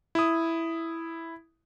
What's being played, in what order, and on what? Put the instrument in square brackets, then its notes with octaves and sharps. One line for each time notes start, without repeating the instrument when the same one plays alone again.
[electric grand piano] E4 D#6